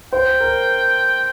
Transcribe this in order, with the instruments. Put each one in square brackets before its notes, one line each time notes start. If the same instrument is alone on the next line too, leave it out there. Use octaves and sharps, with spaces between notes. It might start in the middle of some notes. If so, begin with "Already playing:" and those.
[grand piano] C5 [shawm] G5
[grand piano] A#4